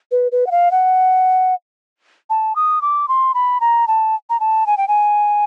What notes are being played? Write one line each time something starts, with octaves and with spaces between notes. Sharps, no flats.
B4
B4
F#5
F5
F#5
A5
D#6
D6
C6
B5
A#5
A5
A#5
A5
G#5
G5
G#5